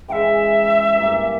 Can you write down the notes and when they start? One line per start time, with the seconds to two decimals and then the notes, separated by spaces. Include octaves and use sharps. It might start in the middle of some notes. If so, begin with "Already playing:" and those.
0.08 C#3 E3 G#3 D#4 E5 G5
0.96 G2 E3 A#3